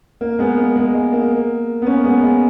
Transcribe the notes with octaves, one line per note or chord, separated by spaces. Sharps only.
A#3
G#3 B3
A#3
G#3
G#3
A#3
B3
A#3 C#4
G#3 B3
G#3